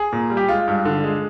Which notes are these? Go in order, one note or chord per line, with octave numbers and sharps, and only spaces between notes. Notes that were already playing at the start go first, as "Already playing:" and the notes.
Already playing: G#4
A#2
G3
G4
G#3 F4
G2
D3
G#3